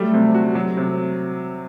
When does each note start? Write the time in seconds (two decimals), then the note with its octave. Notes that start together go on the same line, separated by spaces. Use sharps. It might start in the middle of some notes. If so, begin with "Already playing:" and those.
Already playing: F#3 G3 A3
0.14 C3
0.34 F#4
0.55 F#3
0.77 C3